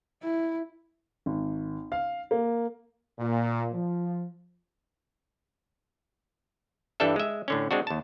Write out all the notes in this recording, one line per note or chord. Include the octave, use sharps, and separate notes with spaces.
E4
G#1
F5
A#3
A#2
F3
G2 E3 G3 D4 A4 E5
G#3 E5
A2 D3 C#4
G#3 C4 D4 F#4
D#2 A5